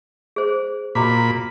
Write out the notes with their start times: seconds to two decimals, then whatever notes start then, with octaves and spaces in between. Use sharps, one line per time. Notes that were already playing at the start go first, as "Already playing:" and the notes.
0.36 G#4 C5
0.95 A#2 F#4 A#5 B5 D6